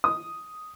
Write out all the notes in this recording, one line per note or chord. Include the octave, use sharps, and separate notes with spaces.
D#6